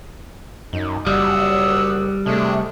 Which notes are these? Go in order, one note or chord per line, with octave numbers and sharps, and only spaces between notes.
F#2 D#4
F#1 G3 F#4 D5 F#5 D#6 E6
C3 G#3 A3 D4